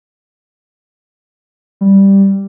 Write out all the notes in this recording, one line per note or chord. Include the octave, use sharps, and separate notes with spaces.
G3